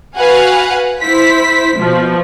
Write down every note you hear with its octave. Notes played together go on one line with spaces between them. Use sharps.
F#4 B4 F5 F#5 G#5
E4 C5 B6
B2 F3